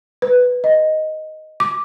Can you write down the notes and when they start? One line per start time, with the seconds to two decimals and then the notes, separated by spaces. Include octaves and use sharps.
0.22 B4
0.64 D#5
1.60 D6